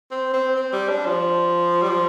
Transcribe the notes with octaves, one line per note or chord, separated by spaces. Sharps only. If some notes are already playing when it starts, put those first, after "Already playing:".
C4
C4
C4
G3
D4
F3
G3
F3